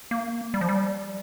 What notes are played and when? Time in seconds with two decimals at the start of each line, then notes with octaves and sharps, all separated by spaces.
0.11 A#3
0.54 G3
0.61 F3
0.69 G3